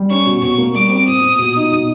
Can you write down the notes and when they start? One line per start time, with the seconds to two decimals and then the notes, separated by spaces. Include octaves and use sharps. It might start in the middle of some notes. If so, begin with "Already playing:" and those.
Already playing: G3
0.10 C#4 C#6
0.26 B2
0.42 B2 C#6
0.58 A#3
0.75 G3 D6
0.90 C4
1.07 A#2 D#6
1.23 A#2
1.39 B2
1.56 D#4
1.71 B2